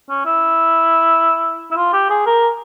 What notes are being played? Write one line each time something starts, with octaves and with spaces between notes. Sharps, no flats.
C#4
E4
E4
F4
G4
G#4
A#4